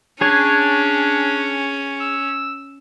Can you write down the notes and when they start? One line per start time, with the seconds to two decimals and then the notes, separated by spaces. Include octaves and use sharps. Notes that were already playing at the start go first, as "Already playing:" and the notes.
0.21 C#4 D4 G#4 C#5 G#5
2.00 E6